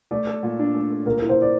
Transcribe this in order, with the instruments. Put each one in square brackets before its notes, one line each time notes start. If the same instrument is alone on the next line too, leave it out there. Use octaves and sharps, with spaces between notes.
[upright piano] A3 [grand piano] D5
[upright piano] A4
A#2
D4
A3
A4
[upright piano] A#2 [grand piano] A#4
[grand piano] A#4
[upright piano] E4
[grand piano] C5
D5